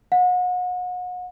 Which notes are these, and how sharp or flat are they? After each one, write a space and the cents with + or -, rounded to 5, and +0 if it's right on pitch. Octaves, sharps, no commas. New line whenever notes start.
F#5 -35